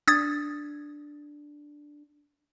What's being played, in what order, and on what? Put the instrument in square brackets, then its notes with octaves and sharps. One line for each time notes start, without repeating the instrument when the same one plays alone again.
[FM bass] D4 [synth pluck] D#6 G#6 A6